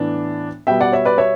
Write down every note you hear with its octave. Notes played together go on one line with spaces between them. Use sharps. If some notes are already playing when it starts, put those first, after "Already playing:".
Already playing: A2 E3 B3 D4
B2 G3 B3 E5 G5
D5 F#5
C#5 E5
B4 D5
C#5 E5